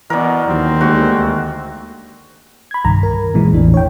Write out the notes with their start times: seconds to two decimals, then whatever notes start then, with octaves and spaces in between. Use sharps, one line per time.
0.10 B2 E3 B3 A#4 D5
0.48 D#2 F#3 C4
0.81 D2 G#3 A#3 F#4
2.71 B5 G#6
2.85 C2 G2 D#3 A#5
3.03 A#4
3.34 A#2 E3 G#3
3.53 A1 E2 A2 E3 D4
3.74 C#5 G5